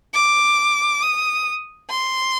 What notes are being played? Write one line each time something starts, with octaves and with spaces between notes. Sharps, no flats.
D6
D#6
C6